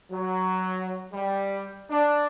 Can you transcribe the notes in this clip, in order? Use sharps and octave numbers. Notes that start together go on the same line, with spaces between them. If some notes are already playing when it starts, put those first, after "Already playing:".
F#3
G3
D4